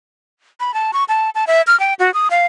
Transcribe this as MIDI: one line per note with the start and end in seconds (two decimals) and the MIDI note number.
0.60 0.74 83
0.74 0.91 81
0.93 1.04 85
1.09 1.30 81
1.35 1.45 81
1.47 1.62 76
1.67 1.78 89
1.80 1.94 79
1.99 2.13 66
2.14 2.28 87
2.31 2.46 77